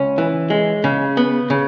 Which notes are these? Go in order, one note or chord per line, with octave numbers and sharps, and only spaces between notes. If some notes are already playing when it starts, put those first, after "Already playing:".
Already playing: C#2 C#4
E3
G#3
C#3
B3
C#3